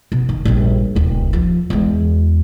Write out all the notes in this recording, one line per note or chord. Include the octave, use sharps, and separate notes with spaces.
B2
D#3
A#1 G3
D#1 C#2
F3
E2 G#3